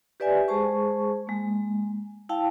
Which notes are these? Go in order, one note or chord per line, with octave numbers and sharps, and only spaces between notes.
G4 B4 D5 E5 G#5
G#3 G#4 C5 A5 C#6
G#3 A#3
E4 F5 G5 A5